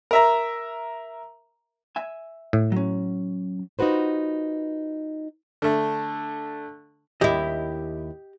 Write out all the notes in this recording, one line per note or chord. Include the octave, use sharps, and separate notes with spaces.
A#4 E5 A#5
E5 G#5
A2
F#3 C#4
D#4 F4 F#4 B4 C5
D3 A3
D#2 E4 G4 D#5